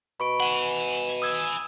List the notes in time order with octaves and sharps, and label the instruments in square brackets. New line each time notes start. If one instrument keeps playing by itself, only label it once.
[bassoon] B2 [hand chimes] B5 C#6 D7
[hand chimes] F#5 [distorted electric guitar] G#5 B5
[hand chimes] D#6 E6 G#6